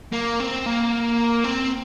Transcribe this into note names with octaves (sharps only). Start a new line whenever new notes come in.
A#3
C4
A#3
C4